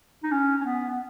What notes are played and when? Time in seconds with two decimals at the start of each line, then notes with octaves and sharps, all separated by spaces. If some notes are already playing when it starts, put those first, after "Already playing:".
0.24 D#4
0.31 C#4
0.61 C#4
0.65 B3
0.90 B3